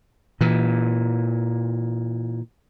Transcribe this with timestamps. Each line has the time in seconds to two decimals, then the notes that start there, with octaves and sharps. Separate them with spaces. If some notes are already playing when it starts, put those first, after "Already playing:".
0.41 A#2 E3